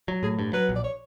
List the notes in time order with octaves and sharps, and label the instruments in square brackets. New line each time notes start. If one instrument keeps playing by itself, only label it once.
[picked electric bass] F#3
[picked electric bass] A2 [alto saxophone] G#4
[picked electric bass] G2
[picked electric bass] F#3 [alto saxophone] B4
[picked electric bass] A#1
[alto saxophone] D5
C#5